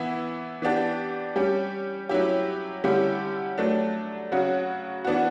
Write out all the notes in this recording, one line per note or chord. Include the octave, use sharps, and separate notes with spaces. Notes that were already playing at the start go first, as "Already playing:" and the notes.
Already playing: E3 B3 E4
E3 B3 D4 G4
G3 C#4 G4
F#3 C#4 E4 G4
D3 G3 C#4 E4 G4
F#3 A3 D4
C#3 F#3 C#4 F#4
E3 B3 D4 F#4